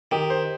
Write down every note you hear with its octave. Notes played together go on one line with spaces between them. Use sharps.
D#3 G4
C5